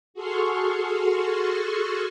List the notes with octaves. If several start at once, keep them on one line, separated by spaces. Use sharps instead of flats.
F#4 G#4 A4 C6 C#6 F6